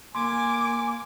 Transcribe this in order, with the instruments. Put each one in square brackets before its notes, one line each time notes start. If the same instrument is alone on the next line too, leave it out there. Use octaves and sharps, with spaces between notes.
[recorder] A#3 [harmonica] G#5 [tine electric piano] C6 [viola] D6